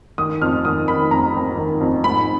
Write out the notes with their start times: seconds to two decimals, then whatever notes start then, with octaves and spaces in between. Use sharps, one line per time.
0.18 D#3 D#6
0.41 F2 F6
0.65 D#3 D#6
0.88 D#3 B5
1.11 F2 A#5
1.34 F2
1.57 D#3
1.81 F2
2.04 G#2 B5